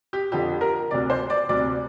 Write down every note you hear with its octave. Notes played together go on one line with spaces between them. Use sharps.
G4
F2 D3 G4
A#4
D2 C3 D5
C5
D5
D2 C3 D5